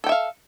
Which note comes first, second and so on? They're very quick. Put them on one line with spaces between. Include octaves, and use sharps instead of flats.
A4 G5 E5 F5